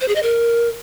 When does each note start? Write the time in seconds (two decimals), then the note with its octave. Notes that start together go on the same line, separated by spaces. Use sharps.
0.01 C5
0.08 G#4
0.15 D#5
0.23 A#4